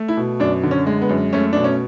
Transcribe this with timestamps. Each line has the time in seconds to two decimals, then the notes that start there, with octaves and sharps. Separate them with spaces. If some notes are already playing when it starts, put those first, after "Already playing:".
Already playing: A3
0.08 E4
0.17 B2
0.40 F#2 D4
0.63 D3
0.71 C#4
0.87 G#3
1.02 B3
1.09 F#2
1.33 A3 C#4
1.53 B2 D4
1.64 C#4